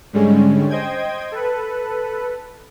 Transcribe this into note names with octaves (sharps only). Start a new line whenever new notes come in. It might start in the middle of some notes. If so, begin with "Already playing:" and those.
G#2 D3 G3 G#3 C#4
C5 D#5 G5 G#6
A4 B4